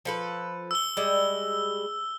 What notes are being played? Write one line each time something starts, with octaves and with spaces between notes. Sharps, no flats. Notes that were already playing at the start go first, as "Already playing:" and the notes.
F3 A4 B4
E6 G7
G3 G#3